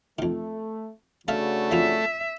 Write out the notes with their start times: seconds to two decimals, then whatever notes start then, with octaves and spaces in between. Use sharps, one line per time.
0.19 F2 D#3 A3
1.28 C#3 A3 D4 F#4 E5 F5 A#5
1.71 F2 A#3 F4 E5